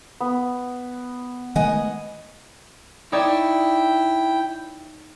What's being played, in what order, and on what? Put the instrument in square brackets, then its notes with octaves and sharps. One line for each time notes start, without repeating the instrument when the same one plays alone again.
[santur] B3
[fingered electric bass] D#3 G#3 A3 [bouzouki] D#5 F#5 G#5
[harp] D#4 C#5 D5 [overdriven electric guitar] E4 [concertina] G5